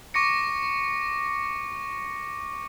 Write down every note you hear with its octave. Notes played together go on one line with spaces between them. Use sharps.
C#6 D6 A#6 C#7